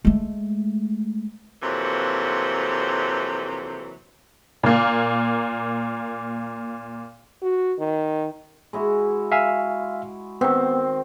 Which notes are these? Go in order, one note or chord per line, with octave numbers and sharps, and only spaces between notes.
G#3 A3
F2 C3 E3 F#3 A#3
A#2 A#3
F#4
D#3
G#3 E4 F#4
E5 F5 G#5
D#3 B3 C4